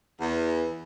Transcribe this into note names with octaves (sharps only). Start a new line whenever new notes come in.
E2